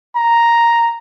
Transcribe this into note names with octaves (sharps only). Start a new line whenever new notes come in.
A#5